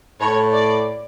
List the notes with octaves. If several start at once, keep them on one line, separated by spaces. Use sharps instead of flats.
A2 C#5
D5